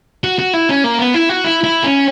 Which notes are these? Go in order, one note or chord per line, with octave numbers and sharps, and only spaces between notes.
F#4
F#4
E4
C#4
A#3
B3
E4
F#4
E4
E4
C#4